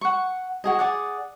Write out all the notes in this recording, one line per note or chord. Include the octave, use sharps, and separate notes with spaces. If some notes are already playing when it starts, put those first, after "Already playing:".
F#5 C#6
F#4 G#4 D#5
G#4 D5 F#5